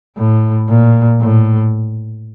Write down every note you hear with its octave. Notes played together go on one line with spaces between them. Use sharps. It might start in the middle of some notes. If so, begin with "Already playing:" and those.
A2
A#2
A2